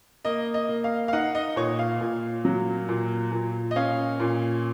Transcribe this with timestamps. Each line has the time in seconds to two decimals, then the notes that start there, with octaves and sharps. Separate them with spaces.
0.25 A#3 D#5
0.54 D#5
0.69 A#3
0.84 F5
1.08 F5
1.13 D#4 F#5
1.35 D#5
1.56 A#2 C#5
1.79 F5
2.01 A#2
2.45 F#3
2.89 A#2
3.32 A#2
3.71 D#5
3.76 C#4 F5
4.20 A#2